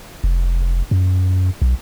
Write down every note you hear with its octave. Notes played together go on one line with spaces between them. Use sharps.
F1
F#2
B1